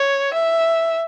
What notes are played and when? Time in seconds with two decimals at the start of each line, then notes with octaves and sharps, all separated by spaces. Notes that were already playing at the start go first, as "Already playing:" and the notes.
Already playing: C#5
0.33 E5